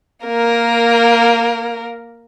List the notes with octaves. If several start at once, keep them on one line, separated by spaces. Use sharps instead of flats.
A#3 A#4